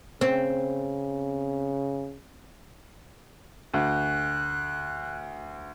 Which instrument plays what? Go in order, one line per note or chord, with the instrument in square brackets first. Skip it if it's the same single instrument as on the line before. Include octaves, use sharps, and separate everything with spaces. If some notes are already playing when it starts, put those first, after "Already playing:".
[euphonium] C#3 [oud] C4
[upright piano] D2 [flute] F#6